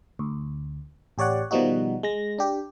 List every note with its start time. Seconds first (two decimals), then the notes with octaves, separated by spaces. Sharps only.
0.19 D2
1.18 A1 G4 C#5 D5 F#5
1.51 B2 D#3 F3 G3 D#4 F#4
2.03 G#3 A#6
2.38 D4 G4